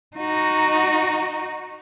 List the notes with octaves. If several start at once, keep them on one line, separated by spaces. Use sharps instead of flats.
D#4 F#4